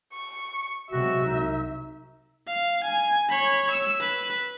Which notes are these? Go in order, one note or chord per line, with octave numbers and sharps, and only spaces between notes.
C#6
C3 F#3 G#3 F#4 E5
C2 D#4
F5
G#5
C#5 B5
E6
B4